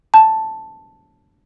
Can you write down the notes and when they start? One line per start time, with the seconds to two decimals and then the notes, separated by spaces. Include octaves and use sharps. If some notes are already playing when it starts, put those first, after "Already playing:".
0.14 A5